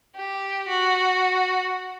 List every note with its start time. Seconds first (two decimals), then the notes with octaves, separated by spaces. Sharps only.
0.15 G4
0.68 F#4